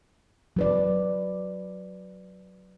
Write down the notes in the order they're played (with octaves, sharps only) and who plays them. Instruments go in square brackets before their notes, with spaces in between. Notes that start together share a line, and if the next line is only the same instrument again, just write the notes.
[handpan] F#3 B4 D5